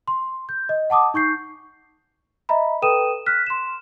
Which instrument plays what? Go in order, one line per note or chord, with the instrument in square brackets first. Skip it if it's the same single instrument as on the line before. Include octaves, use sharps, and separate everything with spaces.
[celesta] C6
G6
D#5
F#5 A5 D6 D#6
D#4 C#6 G6 C7
D#5 E5 A#5 B5
A4 B4 G5 D#6 D#7 E7
F6 F#6 B6
C6 E7